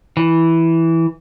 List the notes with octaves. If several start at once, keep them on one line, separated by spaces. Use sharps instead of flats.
E3